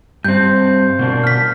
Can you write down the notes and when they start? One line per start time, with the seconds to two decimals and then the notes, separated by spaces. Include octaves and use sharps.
0.24 G2 C4 G6
0.99 B2 A#3 D4
1.24 F6 B6